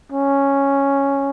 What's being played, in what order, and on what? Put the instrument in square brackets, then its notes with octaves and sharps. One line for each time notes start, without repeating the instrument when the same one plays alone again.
[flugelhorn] C#4